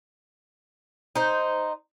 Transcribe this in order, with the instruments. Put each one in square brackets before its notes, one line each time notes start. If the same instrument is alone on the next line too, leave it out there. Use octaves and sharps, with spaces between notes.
[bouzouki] D#4 C5